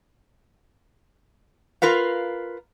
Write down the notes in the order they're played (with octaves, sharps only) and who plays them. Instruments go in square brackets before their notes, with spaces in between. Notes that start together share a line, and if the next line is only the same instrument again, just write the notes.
[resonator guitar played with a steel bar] F4 A#4 B4 F5